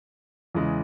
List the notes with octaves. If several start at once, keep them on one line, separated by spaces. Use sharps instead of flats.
E2 C#3 E3 G#3